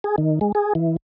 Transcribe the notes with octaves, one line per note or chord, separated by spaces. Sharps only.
G#4
D#3
G#3
G#4
E3